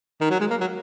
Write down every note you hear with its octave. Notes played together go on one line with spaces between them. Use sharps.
D#3
F#3
G#3
A#3
F#3